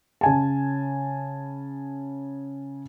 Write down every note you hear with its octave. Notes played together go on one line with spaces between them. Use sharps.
C#3 G#5 A5